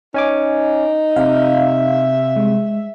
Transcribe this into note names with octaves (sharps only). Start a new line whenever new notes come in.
C#4 D#4 G#5 D6
C3 E5 F5
G#3